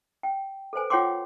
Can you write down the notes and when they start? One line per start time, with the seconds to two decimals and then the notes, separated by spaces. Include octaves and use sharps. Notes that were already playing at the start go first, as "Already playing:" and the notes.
0.23 G5
0.73 A4 B4 C5 G#5
0.90 F4 C#5 F#5 G5 C6 D6